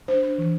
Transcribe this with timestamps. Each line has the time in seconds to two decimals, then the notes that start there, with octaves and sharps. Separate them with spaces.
0.08 D4 C5
0.23 D4
0.38 E3